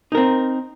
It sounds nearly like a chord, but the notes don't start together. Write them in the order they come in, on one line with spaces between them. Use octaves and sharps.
D#4 A#4 C4